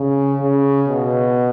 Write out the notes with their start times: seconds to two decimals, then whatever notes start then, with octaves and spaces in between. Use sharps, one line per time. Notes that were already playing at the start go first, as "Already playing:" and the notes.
Already playing: C#3
0.41 C#3
0.88 B2